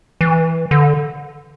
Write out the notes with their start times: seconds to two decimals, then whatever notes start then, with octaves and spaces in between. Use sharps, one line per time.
0.21 E3
0.71 D3